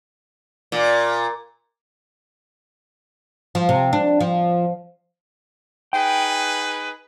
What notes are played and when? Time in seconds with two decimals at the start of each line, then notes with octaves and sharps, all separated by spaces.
0.72 A#2
3.55 F3
3.69 C3
3.93 D4
4.20 F3
5.93 D#4 G#4 B4 G5